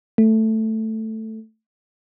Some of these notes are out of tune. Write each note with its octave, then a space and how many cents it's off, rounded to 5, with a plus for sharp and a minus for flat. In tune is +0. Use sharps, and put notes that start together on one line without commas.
A3 +5